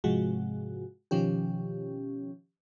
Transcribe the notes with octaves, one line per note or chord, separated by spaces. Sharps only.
G#2 C3 F3 G#3 F#4
B2 D#3 F3 C#4 G4